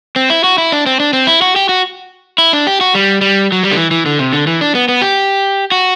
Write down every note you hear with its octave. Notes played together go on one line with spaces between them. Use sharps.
C4
E4
F#4
E4
D4
C4
D4
C4
E4
F#4
G4
F#4
E4
D4
G4
F#4
G3
G3
F#3
G3
D3
E3
E3
D3
C3
D3
E3
D4
B3
B3
G4
F#4